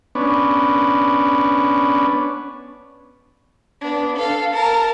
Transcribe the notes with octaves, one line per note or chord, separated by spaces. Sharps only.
B3 C#4 D4
B3 D4
A4 F5
A#4 A5